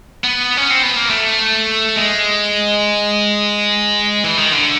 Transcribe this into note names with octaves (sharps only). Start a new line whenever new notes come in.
B3
C#4
C4
B3
A#3
A3
G#3
E3
D#3
D3